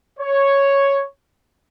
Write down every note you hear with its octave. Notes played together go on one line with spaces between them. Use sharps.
C#5